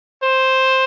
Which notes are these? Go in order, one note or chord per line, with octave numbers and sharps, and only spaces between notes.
C5